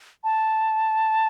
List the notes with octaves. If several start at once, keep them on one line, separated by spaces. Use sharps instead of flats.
A5